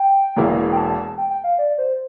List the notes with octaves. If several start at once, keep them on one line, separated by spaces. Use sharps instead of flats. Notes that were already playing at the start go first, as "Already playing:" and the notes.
Already playing: G5
E1 E2 E3 A#3 E4
G5
A5
G5
G5
F5
D5
C5